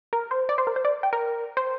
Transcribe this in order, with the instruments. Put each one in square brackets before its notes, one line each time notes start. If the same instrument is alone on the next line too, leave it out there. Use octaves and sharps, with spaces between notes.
[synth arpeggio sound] A#4
C5
D5
C5
A#4
C5
D5
G5
A#4
C5